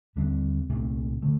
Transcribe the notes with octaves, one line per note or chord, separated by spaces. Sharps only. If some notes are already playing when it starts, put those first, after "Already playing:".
D#2 D3 G3 C4
C2 A#2 A3 C4
D3 A3